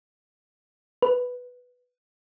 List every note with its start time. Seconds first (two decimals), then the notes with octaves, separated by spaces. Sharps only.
1.02 B4